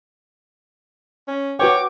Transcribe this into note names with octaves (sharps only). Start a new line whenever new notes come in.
C#4
F#4 B4 C#5 G5 D6